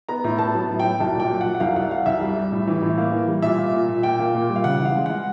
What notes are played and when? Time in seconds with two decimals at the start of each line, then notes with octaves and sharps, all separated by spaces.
0.09 B3 A#5
0.24 A2
0.38 B3 A5
0.55 F#3
0.69 A2
0.80 F#3 G5
1.00 C2 A5
1.15 A#2 G5
1.30 F#3
1.41 F#5
1.46 F#3
1.55 F#5
1.60 C2 F5
1.76 C2 F#5
1.91 F#3 F5
2.06 C2 E5
2.21 G3
2.36 G3
2.52 A2
2.67 E3
2.82 A2
2.98 A#3
3.12 E3
3.28 G3
3.42 A#2 E5
3.58 A#3
3.73 A#2
3.88 A#2
4.03 A#2 G5
4.19 A#3
4.35 A#2
4.49 G3
4.56 F5
4.64 C#3 F#5
4.80 E3
4.85 F5
4.96 G#3
5.06 G#3 F#5